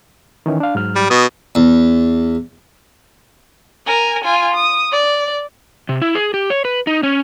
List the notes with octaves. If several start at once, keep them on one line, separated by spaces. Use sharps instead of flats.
D#3 E3 C#4
D4 F5
G#2 F#3 F6
G3
B2 D#6
E2
A#4 G#5
F4 G#5
D#6
D5
C3
E4
G#4
G4
C#5
B4
D#4
C#4